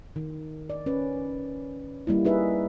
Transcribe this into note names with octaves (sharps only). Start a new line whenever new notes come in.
D#3
D5
C#4 B4
G3 A#3 E4
D#4 G#4 B4 E5